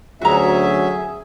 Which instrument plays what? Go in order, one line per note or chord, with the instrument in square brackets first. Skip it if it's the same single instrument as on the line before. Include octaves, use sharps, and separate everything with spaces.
[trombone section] D2 [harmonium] F#3 C#4 E5 [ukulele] F#4 A#5 [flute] G#4